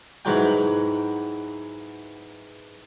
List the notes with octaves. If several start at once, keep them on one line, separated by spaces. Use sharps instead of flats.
G#2 E3 F#3 G5